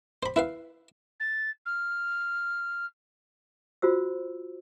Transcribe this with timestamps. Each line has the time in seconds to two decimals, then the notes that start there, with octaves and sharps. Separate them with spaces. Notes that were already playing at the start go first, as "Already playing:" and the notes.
0.23 C5 B5
0.36 E4 B4 F5
1.20 A6
1.66 F6
3.82 F4 F#4 C5 E6